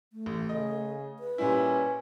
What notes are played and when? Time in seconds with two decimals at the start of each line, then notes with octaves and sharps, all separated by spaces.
0.13 A3
0.26 A1
0.49 C#3 D#5
1.19 B4
1.38 A#2 G3 C#4 E4